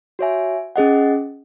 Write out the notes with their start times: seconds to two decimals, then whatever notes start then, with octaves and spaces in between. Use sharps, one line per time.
0.19 F#4 C#5 E5 G#5
0.76 C#4 G#4 D#5 F#5